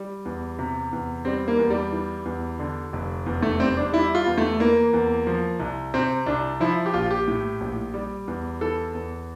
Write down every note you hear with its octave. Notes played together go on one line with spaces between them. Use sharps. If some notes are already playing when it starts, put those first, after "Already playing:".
Already playing: G3
E2
C3
E2
G3 C4
A#3
E2
G3
E3
E2
D3
F1
E2
A3
G3 C4
D4
G3 E4
F4
E2
A3
E3 A#3
E2
F3
C2
C3 C4
C2 D4
F3 E4
G4
A#1 F4
G4
A2
A#1
G3
E2
E3 A4
E2